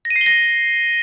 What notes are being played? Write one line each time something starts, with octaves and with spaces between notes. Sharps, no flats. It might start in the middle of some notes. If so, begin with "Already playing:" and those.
A#6
D#7
C7
G7
A#6